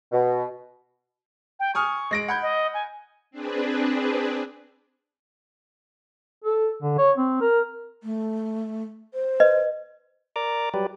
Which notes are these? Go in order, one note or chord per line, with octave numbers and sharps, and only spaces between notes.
B2
G5
G#5 C#6 D#6 F6
G#3 A#6 D7
F#5 B5 G6 G#6
D#5
G#5
C4 D4 G#4 B4
A4
D3
C#5
C4
A#4
A3
C5
B4 D#5
A#4 D5 A#5 D6
F#3 G3 G4 B4 D5